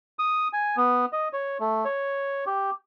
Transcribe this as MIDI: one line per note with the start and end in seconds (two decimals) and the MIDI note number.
0.19 0.48 87
0.53 0.76 80
0.77 1.05 59
1.13 1.28 75
1.33 1.58 73
1.60 1.85 57
1.85 2.44 73
2.46 2.70 67